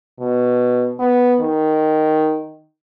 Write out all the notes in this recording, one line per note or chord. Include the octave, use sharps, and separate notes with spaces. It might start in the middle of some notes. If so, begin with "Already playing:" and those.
B2
B3
D#3